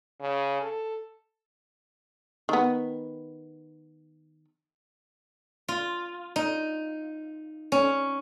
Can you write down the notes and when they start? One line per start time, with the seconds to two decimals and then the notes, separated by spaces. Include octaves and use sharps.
0.21 C#3
0.62 A4
2.49 D#3 B3
5.68 F4
6.36 D#4
7.72 C#4